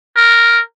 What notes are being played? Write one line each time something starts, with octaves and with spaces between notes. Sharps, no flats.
A#4